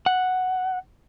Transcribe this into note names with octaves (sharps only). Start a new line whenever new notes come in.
F#5